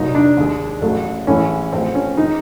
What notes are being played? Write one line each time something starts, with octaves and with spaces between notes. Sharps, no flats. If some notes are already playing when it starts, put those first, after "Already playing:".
Already playing: C2 A#2 F#3 D#4
D4
D#2 D#3 G#3
A1 A2 F#3 A3
A1 A2 E3 G#3 C#4
A1 A2 F3 C4
C#4
D#3 G#3 D#4